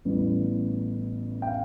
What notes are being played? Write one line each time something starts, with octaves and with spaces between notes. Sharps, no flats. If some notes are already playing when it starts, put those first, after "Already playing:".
A1 A2 G3 B3
G5
F5